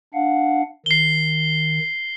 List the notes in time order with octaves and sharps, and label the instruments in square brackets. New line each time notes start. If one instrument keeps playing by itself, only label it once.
[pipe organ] D4 F5 F#5
[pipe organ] D#3 [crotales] C7 G7